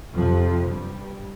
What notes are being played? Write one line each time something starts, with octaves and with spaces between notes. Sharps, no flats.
F2 C3 F3
G2 G3